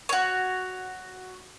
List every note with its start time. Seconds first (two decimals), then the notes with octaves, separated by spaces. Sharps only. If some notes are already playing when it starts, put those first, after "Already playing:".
0.09 F#4 C#5